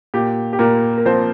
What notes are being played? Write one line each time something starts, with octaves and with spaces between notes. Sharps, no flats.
A#2 G4
G4
A#2 A#3 A#4
A#4
F3 C4 C5